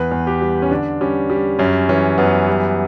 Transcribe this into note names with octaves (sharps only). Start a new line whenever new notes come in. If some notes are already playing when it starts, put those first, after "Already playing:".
Already playing: E2 B4
E2
G4
G3
C#4
D3 D4
G3 C#4
G3
F#2 C#4
E3 C#4
F#2 B3
G3